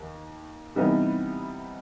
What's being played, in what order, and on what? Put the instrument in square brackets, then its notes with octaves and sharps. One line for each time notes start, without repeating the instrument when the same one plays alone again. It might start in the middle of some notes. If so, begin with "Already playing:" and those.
Already playing: [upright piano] D#2
C3 E3 G3 B3 D#4